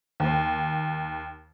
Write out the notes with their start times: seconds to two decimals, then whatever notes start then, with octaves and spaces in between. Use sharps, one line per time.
0.20 D#2